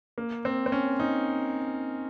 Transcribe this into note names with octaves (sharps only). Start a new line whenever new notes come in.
A#3
C4
C4
C#4
D#4